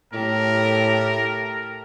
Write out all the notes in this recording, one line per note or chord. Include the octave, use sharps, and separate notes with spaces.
A2 G4 A4 A#4